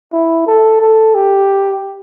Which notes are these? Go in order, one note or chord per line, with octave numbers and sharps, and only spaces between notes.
E4
A4
A4
G4